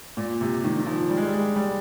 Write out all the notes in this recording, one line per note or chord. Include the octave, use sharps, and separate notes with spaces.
A#2
C3
D#3
D#3
F3
G3
G#3
G3
G#3
G3